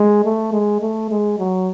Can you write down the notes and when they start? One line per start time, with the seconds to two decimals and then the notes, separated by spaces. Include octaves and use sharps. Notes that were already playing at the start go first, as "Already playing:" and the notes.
Already playing: G#3
0.24 A3
0.53 G#3
0.81 A3
1.11 G#3
1.39 F#3